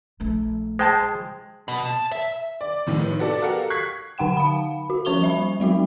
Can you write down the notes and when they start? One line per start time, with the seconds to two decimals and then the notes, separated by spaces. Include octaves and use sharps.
0.20 A#1 A3
0.79 G#3 C5 G5 A5
1.68 B2
1.86 A5
2.12 E5
2.61 D5
2.87 F1 A2 D#3 B3
3.19 B3 F#4 A4 D5
3.42 F#4 G4 A4 A#4 F5 F#5
3.70 C#6 F#6 G#6 B6 C7
4.18 D3 D#4 F#5 G5 E7
4.37 F5 B5
4.90 F#4
5.05 F3 C#4 C5 C#6 F7 G7
5.22 G3 E5 B5
5.60 F#3 G#3 B3 F#4